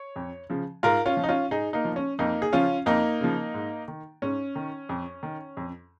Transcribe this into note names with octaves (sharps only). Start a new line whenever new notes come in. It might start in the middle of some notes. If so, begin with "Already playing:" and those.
Already playing: C#5
F2
C#3 F3
G#2 F4 A#4
C#4 F4
F3
D#4
C#4 F4
G#2 D#4 G#4
A#3 D#4
F3
C#4
F2 A#3 D#4
G#4
C#3 F3 C#4 F4
F2 A#3 D#4
C#3 F3
G#2
D#3
G#2 C#4
D#3
F2
D#3
F2